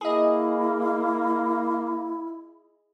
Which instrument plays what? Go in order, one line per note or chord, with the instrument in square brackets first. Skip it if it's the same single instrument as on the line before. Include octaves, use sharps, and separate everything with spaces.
[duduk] A#3 [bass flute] E4 [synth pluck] G#4 D#5